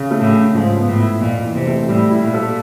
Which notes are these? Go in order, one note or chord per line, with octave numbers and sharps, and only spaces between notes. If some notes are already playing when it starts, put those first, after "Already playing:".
Already playing: C#3
A3
A2
C#3
G#2 F3
B3
A2
E4
F2 A#2
E3
C3
A3
A2 G3
E4
A#2
A4